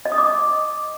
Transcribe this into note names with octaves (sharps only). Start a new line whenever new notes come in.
D#5
D#6
D6